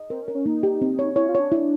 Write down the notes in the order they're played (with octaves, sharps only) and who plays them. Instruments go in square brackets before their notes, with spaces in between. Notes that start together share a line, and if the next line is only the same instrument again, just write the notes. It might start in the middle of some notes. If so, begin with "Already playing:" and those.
Already playing: [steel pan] D#5
[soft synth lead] C4 [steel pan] A#4
[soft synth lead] C#4
[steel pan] A#4
[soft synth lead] C#4
[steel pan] A#3 [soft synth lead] D#4
[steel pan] G4
C4
C#5
[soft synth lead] E4 [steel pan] C#5
[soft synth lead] F4
[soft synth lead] D4 [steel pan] C#5
[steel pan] E4